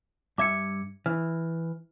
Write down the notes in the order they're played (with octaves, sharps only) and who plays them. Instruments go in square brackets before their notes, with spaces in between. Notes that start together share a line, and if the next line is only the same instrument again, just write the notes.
[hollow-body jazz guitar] G2 E5 [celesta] D6 G#6 C#7
[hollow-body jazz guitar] E3 [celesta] F6